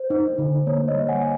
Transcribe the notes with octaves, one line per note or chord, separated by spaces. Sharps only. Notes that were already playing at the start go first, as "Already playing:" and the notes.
Already playing: C5
D#4
D3
A#3 C#5
C#5 D#5
G3
F#5 G#5